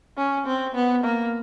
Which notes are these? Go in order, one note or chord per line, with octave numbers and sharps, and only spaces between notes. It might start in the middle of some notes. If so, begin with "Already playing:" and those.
C#4
C4
B3
A#3